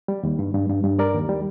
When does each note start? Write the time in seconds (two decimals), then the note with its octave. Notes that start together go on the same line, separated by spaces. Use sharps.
0.08 G3
0.23 D#2
0.39 G2
0.54 G2
0.69 G2
0.84 G2
0.99 G3 A#4 D5
1.15 D#2
1.29 G3